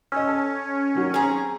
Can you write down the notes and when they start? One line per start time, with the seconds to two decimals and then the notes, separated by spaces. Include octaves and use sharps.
0.12 C#4 D#5 E6
0.27 A4
0.95 D#3 F#3
1.14 C4 G#4 G#5 A#5